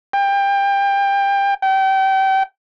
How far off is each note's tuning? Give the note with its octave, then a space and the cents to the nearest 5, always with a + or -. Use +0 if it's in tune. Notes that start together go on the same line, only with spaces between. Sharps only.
G5 +25
G5 -30